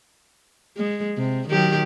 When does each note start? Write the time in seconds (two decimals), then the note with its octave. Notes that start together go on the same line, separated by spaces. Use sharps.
0.77 G#3
1.17 C3
1.49 D#3 F#3 G4